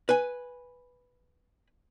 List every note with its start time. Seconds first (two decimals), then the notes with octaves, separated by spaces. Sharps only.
0.09 B4 G#5